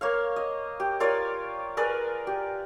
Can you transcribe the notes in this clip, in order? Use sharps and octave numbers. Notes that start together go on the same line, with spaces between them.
A#3 C#5 F5
D#5
G4
F4 A#4 C#5 D5
G#4 A#4 B4 D5
G4